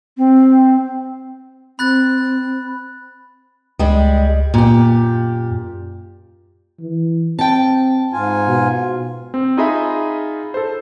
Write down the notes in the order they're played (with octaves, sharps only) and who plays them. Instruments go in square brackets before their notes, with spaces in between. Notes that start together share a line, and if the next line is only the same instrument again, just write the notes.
[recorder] C4
[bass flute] C4 [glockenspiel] B5 F#6 A6
[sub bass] C#2 [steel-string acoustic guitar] G3 G#3
[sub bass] F#2 [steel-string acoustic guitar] A#2 G4
[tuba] E3
[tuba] C4 [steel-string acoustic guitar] G5 A5
[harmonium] G#2 F4 G#5
[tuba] B2
[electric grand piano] C4
D#4 F4 G#4 D#5 E5 B5
A4 C5